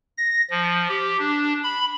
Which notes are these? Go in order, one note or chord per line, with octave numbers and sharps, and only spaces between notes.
A#6
F3
G4
D4
B5